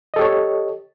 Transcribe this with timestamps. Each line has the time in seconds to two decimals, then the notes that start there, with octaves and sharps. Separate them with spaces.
0.14 D#5
0.16 A4
0.19 G4
0.21 C#5